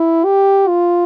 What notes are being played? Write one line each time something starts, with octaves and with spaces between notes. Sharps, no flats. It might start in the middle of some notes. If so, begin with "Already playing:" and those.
Already playing: E4
G4
F4